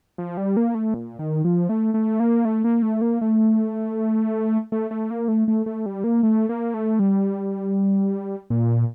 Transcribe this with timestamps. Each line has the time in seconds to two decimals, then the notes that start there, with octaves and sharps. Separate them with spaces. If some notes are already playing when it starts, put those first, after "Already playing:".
0.18 F3
0.37 G3
0.57 A#3
0.75 A3
0.94 A#2
1.19 D#3
1.44 F3
1.69 A3
1.94 A3
2.20 A#3
2.45 A3
2.64 A#3
2.82 A3
3.01 A#3
3.21 A3
4.72 A3
4.91 A3
5.11 A#3
5.28 A3
5.48 A3
5.66 A3
5.86 G3
6.04 A#3
6.23 A3
6.49 A#3
6.74 A3
6.99 G3
8.50 A#2